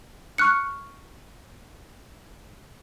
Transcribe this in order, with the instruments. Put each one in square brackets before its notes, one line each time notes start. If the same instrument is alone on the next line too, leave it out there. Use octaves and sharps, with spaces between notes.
[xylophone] C#6 F6 F#6 C#7